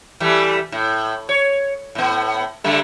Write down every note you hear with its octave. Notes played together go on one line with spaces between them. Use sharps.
E3 G3 A3
A2
C#5
A2 B3
D3 G3 A3